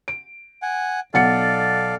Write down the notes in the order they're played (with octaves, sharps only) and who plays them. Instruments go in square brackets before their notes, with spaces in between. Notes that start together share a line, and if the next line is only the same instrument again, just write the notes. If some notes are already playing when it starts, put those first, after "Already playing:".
[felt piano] D7
[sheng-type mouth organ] F#5 G#5
[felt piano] B1 F#5 C#7 [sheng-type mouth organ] A4 D5 F5